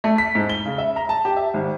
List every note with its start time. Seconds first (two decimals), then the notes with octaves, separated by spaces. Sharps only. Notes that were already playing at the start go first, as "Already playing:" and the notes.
0.04 A3
0.18 B6
0.35 G#2
0.49 G7
0.66 C#3
0.78 E5
0.96 A#5
1.09 A5
1.25 G4
1.37 E5
1.54 G#1